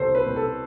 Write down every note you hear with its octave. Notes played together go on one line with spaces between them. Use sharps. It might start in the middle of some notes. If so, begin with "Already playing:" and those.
Already playing: C2 G3 A4 C5
B4
C2
A4